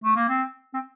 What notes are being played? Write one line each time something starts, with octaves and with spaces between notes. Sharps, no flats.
A3
A#3
C4
C4